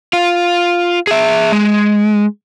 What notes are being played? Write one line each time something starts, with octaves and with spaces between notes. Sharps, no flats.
F4
G#4 E5
G#3